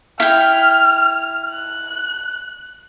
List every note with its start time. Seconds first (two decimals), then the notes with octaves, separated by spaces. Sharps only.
0.20 E4 G5 F6
1.50 F#6